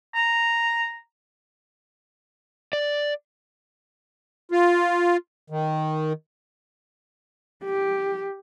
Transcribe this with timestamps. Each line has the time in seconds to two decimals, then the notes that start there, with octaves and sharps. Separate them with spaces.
0.15 A#5
2.73 D5
4.52 F4
5.50 D#3
7.64 G4